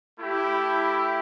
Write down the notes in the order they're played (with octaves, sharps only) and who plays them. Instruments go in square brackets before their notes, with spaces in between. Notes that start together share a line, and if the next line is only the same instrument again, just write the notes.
[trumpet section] A3 E4 G4